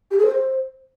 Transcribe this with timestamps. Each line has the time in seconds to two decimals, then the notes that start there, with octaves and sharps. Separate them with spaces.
0.11 G4
0.18 G#4
0.26 C5